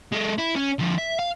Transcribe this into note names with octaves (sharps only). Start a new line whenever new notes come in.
G#3 A4
E4
C#4
D3 F3
E5
F5